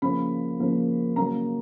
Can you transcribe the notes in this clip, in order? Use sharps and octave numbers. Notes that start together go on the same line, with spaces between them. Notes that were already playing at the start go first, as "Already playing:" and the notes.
C#3 F3 A#3 B5
C#3 F3 A#3
C#3 F#3 A#3 A#5